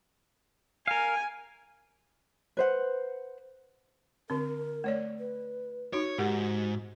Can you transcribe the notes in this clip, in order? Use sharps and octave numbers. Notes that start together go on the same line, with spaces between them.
A#4 F5 G#5
B4 C5 F#5
D3 C4 A#4
A3 C#5 D5
B4
D#4 F#4 C#5
G#2 F#4 G4 A#4 F#5